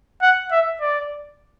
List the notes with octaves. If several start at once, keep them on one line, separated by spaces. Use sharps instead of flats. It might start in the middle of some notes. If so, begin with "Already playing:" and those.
F#5
E5
D5